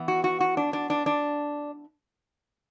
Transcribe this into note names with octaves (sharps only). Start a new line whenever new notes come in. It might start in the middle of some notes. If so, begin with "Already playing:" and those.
Already playing: E3 B3
F#4
F#4
F#4
D4
D4
D4
D4